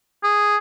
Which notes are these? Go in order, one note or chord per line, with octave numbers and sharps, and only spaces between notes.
G#4